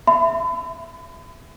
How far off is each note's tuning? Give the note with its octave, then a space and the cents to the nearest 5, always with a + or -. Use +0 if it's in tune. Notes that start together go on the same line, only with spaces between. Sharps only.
E5 +15 B5 +35